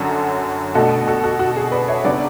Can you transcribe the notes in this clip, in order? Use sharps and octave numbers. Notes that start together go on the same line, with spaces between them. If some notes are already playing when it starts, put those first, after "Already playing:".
Already playing: F#2 D3 F#3 C#4 F#4 A4
B2 A3 D4 F#4 A4
F#4 A4
F#4 A4
F#4
G#4
B4 D5
C#5 E5
C#3 F#3 B3 D4 B4 D5